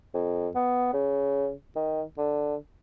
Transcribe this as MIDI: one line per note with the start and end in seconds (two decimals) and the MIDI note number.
0.14 0.48 41
0.55 0.88 59
0.93 1.50 49
1.75 2.02 51
2.18 2.55 50